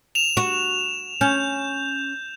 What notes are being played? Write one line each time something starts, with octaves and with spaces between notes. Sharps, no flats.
E7 F7
F#4
C#4 G6